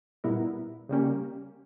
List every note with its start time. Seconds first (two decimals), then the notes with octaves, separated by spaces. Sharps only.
0.24 A#2 G3 B3 E4 A#4
0.89 C#3 G3 A#3 C#4 G4